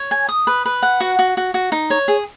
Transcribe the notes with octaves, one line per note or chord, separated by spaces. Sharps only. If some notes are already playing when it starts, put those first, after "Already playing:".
Already playing: C#5
G#5
D#6
B4
B4
F#5
F#4
F#4
F#4
F#4
D#4
C#5
G#4